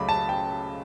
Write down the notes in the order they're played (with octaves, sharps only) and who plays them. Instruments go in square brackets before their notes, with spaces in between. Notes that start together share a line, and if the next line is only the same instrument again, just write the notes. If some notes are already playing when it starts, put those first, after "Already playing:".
Already playing: [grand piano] C#2 C#3 F#3 A3 B5 D6
A5
G5